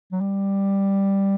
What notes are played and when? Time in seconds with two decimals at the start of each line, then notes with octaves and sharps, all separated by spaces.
0.12 F#3
0.21 G3